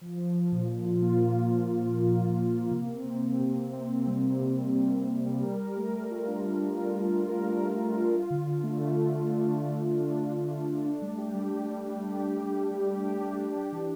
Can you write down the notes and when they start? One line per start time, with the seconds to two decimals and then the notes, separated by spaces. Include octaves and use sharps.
0.01 F3
0.17 F3
0.34 F3
0.52 A#2
0.68 F3
0.85 F4
1.02 A#3
1.20 A#2
1.36 F3
1.52 F3
1.70 F3
1.86 A#3
2.04 A#2
2.21 A#2
2.38 A#3
2.54 A#3
2.71 C3
2.88 C4
3.06 C3
3.22 C4
3.40 C3
3.56 C3
3.73 C4
3.90 C3
4.07 G3
4.25 C3
4.41 C3
4.58 G3
4.75 C3
4.92 C3
5.09 C4
5.26 G3
5.43 A#4
5.59 A#4
5.77 A3
5.94 A3
6.11 F4
6.28 D4
6.43 A3
6.61 A#4
6.78 F4
6.94 D4
7.12 F4
7.29 A#4
7.46 A3
7.63 A3
7.80 F4
7.96 A3
8.13 F4
8.30 D3
8.47 D3
8.64 A3
8.81 D3
8.98 F4
9.15 D4
9.32 A3
9.48 D3
9.66 D3
9.83 A3
10.00 D4
10.16 D4
10.33 D4
10.50 A3
10.67 A3
10.85 D4
11.02 G3
11.18 G4
11.34 G3
11.51 G3
11.69 G3
11.86 D4
12.03 G4
12.19 G4
12.37 G3
12.54 G3
12.71 G3
12.87 G4
13.05 G4
13.21 D4
13.38 G4
13.55 D4
13.72 E3